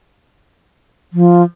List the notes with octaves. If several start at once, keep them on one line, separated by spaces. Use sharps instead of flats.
F3